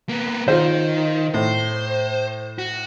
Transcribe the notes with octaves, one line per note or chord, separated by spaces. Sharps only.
A#3 B3
D#3 F4 C5
A2 C5
F#4